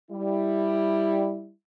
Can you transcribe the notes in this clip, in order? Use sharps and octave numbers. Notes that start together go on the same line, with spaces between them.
G3 E4